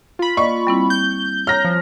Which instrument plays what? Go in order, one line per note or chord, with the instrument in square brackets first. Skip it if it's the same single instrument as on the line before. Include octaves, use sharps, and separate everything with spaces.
[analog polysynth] F4 B5
[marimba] A#3 D5 D#5 [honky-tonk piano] C#6
[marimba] G3 C4 E4
[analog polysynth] G6
[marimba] C#5 A#5 [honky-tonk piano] F6 A#6
[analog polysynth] F3